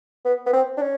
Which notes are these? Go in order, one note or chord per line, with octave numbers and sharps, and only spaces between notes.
B3
B3
C4
D4
C#4